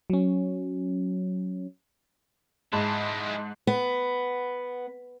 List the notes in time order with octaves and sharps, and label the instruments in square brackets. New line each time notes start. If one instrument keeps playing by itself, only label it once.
[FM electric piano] F#3 C#4
[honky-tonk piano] G#2 A5 [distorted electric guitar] G#3 E4
[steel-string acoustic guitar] B3